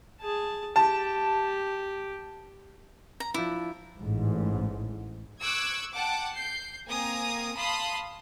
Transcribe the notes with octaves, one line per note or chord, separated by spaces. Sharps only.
G#4 A5
G4 A5
A#5
F3 D4 E4
A1 G#2
C#6 D6 E6 F#6 G#6
F#5 G5 A5 D6
G6 C7
A#3 C4 G#5 A#5 D#6
F5 A5 B5 C6 D#6